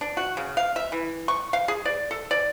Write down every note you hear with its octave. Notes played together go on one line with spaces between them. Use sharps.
D4
F#4
C#3
F5
E5
E3
C#6
F5
G#4
D5
A4
D5